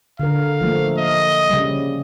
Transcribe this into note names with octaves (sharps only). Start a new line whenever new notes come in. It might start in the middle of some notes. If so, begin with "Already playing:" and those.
D3 A#4 F5
F3 A3 A#3
D#5
C#3 G3